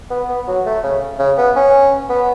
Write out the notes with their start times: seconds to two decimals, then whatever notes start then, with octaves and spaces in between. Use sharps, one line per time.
0.11 B3
0.29 B3
0.48 F#3
0.66 A3
0.83 C#3
1.19 C#3
1.38 B3
1.56 C#4
2.09 B3